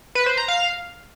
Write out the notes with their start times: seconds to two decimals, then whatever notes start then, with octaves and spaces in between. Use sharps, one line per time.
0.15 B4
0.26 C5
0.37 A#5
0.48 F5